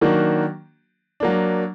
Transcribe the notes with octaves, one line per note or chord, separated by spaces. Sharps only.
D#3 F#3 A#3 D4 F#4
F#3 A#3 D4